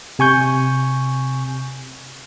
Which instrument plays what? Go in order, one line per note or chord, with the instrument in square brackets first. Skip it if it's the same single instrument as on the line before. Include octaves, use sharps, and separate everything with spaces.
[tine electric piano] C3 G#5 C#6 G6